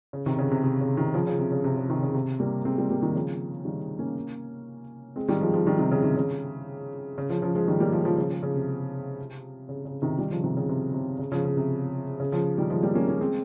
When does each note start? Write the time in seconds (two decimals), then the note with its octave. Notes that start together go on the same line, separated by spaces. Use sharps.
0.13 C#3
0.26 C3 D#3
0.39 C#3
0.51 C3
0.64 C3
0.81 C#3
0.97 C3 D#3
1.14 C#3 F3
1.27 C#3
1.39 C3
1.52 C#3
1.64 C3
1.77 C#3
1.89 C3 D#3
2.02 C#3
2.14 C3
2.40 G3 A#3
2.65 G#3 C4
2.77 G3 A#3
2.90 G3 A#3
3.02 D#3 G3
3.15 C#3 F3
3.65 D#3 G3
3.99 A#3 C#4
5.16 G#3 C4
5.29 D#3 G3
5.41 F3 G#3
5.54 F3 G#3
5.66 D#3 G3
5.79 C3 D#3
5.92 C#3
6.04 C3 D#3
6.16 C#3
7.18 C#3
7.30 C#3 F3
7.42 C#3 F3
7.55 F3 G#3
7.68 D#3 G3
7.80 G3 A#3
7.93 F3 G#3
8.05 C#3 F3
8.17 C#3 F3
8.31 C#3
8.43 C#3
8.56 C3
9.69 C#3
9.85 C#3
10.02 C3 D#3
10.18 D#3 G3
10.31 C#3 F3
10.44 C3 D#3
10.57 C#3
10.69 C3
10.94 C3
11.19 C#3
11.32 C#3 F3
11.45 C#3
11.57 C3
12.20 C#3
12.32 C#3 F3
12.58 D#3 G3
12.70 F3 G#3
12.83 G3 A#3
12.95 A#3 C#4
13.08 A#3 C#4
13.21 G#3 C4